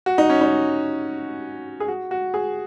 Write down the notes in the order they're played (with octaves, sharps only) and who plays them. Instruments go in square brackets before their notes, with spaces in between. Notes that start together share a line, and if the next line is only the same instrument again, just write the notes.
[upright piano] F#4
D#4
C#4
D#4
G#4
F#4
F#4
G#4